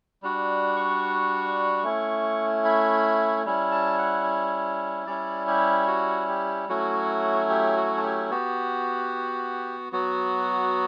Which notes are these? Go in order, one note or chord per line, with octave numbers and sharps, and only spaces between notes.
G3 D4 F#4
C#6
A3 C#4 E4
B5
G3 C#4 E4
A5
F#5
G3 C#4 E4 D5
G4
F#4
G4
F#3 A3 C#4 E4 F#4
G4
F#4
A4
G4
B3 F#4 G4
F#3 B3 F#4